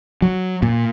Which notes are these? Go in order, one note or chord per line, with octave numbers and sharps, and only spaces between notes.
F#3
A#2